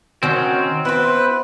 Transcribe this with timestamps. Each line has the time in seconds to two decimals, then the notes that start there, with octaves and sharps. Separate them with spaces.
0.23 D#3 C4 C#4 F#4
0.85 B3 E4 B4 C5